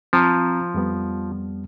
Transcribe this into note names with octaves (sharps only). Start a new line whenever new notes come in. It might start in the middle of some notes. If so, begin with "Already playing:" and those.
F3 C4 A#5
F2 G3 B3